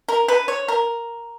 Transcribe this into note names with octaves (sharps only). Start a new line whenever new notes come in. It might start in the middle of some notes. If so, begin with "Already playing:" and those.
A#4
B4
C#5
A#4